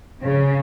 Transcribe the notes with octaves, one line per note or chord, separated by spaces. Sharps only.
C#3